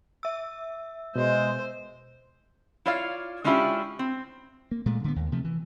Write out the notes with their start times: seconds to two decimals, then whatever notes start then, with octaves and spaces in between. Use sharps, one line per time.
0.23 E5 E6
1.16 B2 G#3 C5
2.86 E4 F4 C#5 D5 F5
3.44 G#3 C#4 D4 E4 F4 G4
3.99 C4
4.71 A#3
4.86 A#2 G#3 A3
5.04 D3 B3
5.16 D#2
5.32 C3 F3 A3
5.44 E3